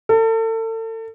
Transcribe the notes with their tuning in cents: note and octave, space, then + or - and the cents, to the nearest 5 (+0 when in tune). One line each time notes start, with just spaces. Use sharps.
A4 +35